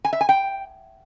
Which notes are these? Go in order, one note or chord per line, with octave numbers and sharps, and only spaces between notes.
G#5
E5
G#5
G5